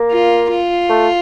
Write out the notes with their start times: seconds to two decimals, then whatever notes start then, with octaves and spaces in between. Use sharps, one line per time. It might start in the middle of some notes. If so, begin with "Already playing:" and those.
Already playing: A#3
0.11 F4
0.50 F4
0.89 A3